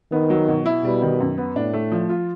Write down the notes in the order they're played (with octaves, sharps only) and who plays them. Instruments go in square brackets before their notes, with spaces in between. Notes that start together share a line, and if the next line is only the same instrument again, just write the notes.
[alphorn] D#3 [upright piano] B3
[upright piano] F#3
B2
E4
[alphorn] B2 [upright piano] G3
[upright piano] D#3
F#2
B3
[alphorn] A2 [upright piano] D4
[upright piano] A3
F3
F4